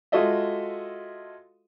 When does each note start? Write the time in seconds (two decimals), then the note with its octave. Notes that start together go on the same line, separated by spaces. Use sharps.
0.12 G#3 F4 F#4 A4 D#5 E5